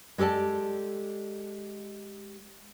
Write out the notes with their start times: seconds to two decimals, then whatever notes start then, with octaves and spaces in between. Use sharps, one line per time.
0.18 G#3 G4 A4 D5 A5